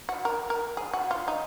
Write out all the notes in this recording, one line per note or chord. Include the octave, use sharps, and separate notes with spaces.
F#4
A#4
A#4
G#4
F#4
F4
D#4